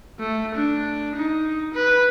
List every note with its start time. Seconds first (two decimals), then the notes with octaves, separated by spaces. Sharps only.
0.19 A3
0.55 D4
1.16 D#4
1.74 B4